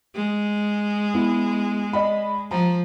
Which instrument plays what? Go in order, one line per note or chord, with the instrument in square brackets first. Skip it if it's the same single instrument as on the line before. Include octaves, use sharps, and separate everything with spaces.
[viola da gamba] G#3
[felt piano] B3 E4
D5 D#5 B5
[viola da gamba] F3 [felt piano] A#5